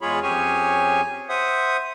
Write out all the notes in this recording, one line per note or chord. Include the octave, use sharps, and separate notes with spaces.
E2 G#3 F4 G#4 C#5 B5
F2 C#4 G4 G#4 C#5 G#5
C5 E5 F#5 D#6